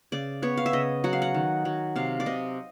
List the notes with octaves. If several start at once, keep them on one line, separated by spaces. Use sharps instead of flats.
C#3 D5
B3 C#5
F5
E5
C#3 D#5
F#3 F#5
F5
F#5
D#3
F#3
C3 F5
D5
C3 D#5